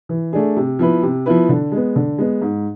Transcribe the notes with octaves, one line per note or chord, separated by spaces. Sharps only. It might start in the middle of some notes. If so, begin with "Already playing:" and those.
E3
A3 D4 G#4
C3
F3 B3 E4 B4
C3
F3 B3 E4 B4
D3
G#3 B3
D3
G#3 B3
G#2